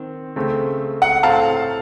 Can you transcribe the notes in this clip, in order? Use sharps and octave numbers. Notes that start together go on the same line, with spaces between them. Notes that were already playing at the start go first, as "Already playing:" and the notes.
Already playing: D#3 C4
C#3 A3 C4
F#5
A2 A3 C4 F5 A5